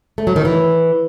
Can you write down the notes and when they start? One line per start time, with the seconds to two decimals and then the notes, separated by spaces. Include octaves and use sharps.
0.18 A3
0.27 F#3
0.36 D#3
0.45 E3